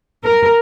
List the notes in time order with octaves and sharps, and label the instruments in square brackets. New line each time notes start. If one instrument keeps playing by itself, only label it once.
[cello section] A#4